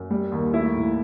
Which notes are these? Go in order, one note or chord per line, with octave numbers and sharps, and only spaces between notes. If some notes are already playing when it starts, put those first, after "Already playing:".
Already playing: F#2
G3
D#2
A3 E4
A2